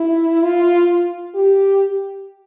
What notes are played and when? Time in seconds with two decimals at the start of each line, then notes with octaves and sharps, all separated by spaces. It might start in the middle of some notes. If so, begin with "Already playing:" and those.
Already playing: E4
0.43 F4
1.35 G4